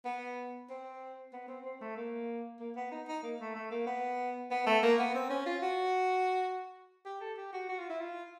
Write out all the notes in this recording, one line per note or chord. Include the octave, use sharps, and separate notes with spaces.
B3
C4
B3
C4
C4
A3
A#3
A#3
B3
D#4
D#4
A#3
A3
A3
A#3
B3
B3
A3
A#3
B3
C4
C#4
F4
F#4
G4
A4
G4
F#4
F#4
F4
E4
F4